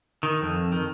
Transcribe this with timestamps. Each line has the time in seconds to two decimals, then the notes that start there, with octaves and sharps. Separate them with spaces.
0.23 D#3
0.42 F2
0.72 D#3